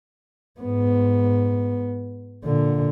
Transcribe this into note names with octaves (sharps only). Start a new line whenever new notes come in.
G#2 B3
A#2 D3